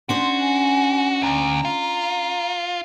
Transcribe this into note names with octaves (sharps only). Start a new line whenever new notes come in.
C#4 D4 F#4 C5 C6
G#5
D2 A#5
F4